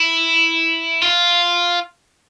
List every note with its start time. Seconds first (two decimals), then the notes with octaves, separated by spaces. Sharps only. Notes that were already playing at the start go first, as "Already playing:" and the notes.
Already playing: E4
1.02 F4